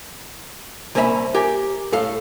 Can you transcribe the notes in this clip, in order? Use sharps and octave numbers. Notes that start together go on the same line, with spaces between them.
C2 A#3 C#4 E5 A#5 B5
G4 A#4 G#5
A2 A4 F5